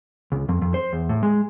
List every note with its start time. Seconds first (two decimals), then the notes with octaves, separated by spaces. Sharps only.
0.32 C#2
0.49 F2
0.62 F2
0.74 C5
0.93 E2
1.09 A2
1.23 G#3